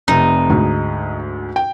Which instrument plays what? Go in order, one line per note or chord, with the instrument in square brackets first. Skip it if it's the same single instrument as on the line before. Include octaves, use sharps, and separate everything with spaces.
[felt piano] F1 C3 [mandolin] D#4
[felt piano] D2 G#2
G5